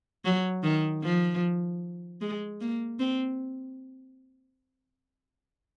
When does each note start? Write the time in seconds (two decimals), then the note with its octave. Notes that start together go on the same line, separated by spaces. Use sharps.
0.25 F#3
0.63 D#3
1.03 F3
2.21 G#3
2.61 A#3
2.99 C4